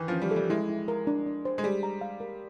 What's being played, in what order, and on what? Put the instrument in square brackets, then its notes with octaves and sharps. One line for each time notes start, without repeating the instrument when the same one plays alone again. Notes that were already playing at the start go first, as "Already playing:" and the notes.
Already playing: [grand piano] D#3 E3
[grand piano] F3 [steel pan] C#4
[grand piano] G3
[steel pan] A4
[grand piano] G3
[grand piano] G#3 [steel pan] E4
[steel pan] E4
A#4
D4
D4
C5
[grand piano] G#3
[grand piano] G3 [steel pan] G#4
[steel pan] A#5
F5
A#4